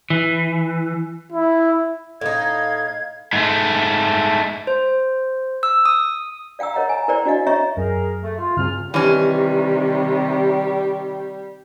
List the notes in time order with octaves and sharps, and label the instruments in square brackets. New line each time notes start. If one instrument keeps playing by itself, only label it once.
[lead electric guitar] E3
[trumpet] E4
[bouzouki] A2 D#4 [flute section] F5 G#6
[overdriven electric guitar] G#2 A3
[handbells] C5
E6
D#6
[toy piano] D5 F5 G5 A#5 E6
A#4 C#5 D#5 F#5 A#5
G#5 A#5
E4 A#4 C5 D5 G5 A#5
D4 F#4 D5 D#5 F5
C#4 C#5 D#5 E5 A#5 C#6
[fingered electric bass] F#2 [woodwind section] G#4 A#4
[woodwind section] A3
F4
[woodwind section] C#2 F4 F6 [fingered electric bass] G2 C#3 C4
[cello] C3 D#3 [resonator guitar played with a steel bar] E3 C#4 [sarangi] G3 [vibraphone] G4